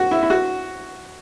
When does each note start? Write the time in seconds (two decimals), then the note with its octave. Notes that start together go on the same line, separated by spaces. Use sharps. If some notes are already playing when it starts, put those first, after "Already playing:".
Already playing: F#4
0.11 E4
0.23 E4
0.30 F#4